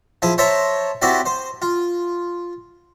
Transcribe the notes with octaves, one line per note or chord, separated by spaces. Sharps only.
F3 E4 G#4
C5 C#5 E5 A5 A#5
C4 E4 F#4 G4 D5
C5
F4